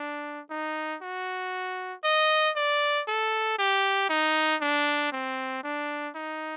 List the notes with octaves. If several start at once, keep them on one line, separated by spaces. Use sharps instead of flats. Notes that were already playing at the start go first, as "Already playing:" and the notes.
Already playing: D4
D#4
F#4
D#5
D5
A4
G4
D#4
D4
C4
D4
D#4